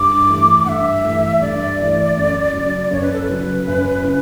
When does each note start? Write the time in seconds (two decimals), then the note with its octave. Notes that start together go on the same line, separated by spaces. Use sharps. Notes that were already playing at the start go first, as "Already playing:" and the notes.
Already playing: G2 D6
0.29 E3 A3
0.65 G2 E5 F#5
1.04 E3 A3
1.41 G2 D5
1.79 E3 A3
2.17 F#2
2.53 C#3 F#3
2.91 F#2 C#5
3.02 B4
3.13 A4
3.23 B4
3.29 C#3 F#3
3.67 F#2
4.05 C#3